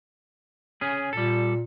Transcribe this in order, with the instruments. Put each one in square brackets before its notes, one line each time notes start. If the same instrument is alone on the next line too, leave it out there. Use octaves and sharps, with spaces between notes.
[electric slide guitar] C#4 G#4
[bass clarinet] A#2 [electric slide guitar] G3 A4